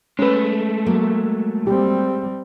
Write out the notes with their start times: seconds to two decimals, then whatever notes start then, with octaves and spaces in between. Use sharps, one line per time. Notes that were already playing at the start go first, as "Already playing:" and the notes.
0.19 G#3 A3 C#4 B4
0.86 F#3 A#3
1.67 G3 C4 G4